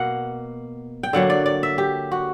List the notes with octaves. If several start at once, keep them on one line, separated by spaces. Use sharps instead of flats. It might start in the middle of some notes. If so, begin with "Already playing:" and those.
Already playing: B2 A#3 F#5
G5
D3 F#3 A#3 F#5
D5
D5
E5
G4
F#4